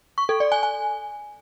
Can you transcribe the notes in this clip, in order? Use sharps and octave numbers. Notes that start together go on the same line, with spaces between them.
C#6
A4
D5
G#5
G#5